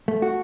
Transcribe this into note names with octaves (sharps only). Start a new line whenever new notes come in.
A3
F#4